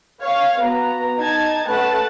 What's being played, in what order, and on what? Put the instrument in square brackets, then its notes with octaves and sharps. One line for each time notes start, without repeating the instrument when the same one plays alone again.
[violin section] C#5 F5
[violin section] B3 [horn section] F#4 A#5
[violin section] D#4 A5 G#6
[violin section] A3 F#5 A5 [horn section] C#4 B4